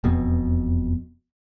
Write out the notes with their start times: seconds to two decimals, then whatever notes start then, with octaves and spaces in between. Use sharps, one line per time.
0.04 E1 F2 B2 B3